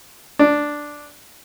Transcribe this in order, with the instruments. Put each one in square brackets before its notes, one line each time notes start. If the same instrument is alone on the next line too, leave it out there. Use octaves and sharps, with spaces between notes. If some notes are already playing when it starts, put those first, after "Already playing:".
[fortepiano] D4